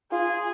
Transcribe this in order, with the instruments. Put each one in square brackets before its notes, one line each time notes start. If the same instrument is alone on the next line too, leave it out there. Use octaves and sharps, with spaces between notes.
[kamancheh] F4 [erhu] G#4